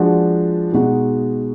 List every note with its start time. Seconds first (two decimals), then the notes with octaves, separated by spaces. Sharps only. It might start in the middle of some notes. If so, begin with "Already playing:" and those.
Already playing: F3 G#3 D4 F#4
0.73 B2 G#3 D#4 F#4